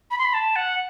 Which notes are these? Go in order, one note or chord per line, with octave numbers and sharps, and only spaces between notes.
B5
C6
B5
A5
F#5